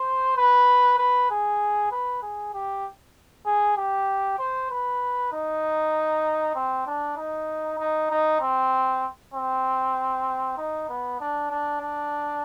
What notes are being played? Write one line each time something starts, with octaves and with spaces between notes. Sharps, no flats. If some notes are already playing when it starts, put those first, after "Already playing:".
Already playing: C5
B4
B4
G#4
B4
G#4
G4
G#4
G4
C5
B4
D#4
C4
D4
D#4
D#4
D#4
C4
C4
D#4
B3
D4
D4
D4